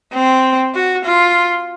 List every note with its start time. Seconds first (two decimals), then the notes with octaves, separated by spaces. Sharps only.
0.13 C4
0.75 F#4
1.05 F4